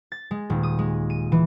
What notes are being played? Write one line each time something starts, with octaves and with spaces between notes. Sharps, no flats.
A6
G#3
D#1
D#6
G#3
D#7
E3